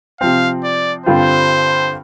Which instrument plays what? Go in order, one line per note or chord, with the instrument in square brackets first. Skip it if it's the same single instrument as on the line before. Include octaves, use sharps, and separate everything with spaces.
[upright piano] C3 F3 C4 [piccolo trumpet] F5
[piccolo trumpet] D5
[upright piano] G2 D3 G3 C4 F4 [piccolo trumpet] C5